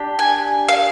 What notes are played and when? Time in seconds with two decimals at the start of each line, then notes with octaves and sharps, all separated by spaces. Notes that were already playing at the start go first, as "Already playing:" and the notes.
Already playing: D4 G4
0.19 G#5
0.69 F5